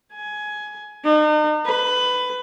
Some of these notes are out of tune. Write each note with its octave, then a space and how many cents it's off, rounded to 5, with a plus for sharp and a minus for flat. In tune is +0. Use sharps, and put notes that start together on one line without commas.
G#5 +15
D#4 -40
B4 +15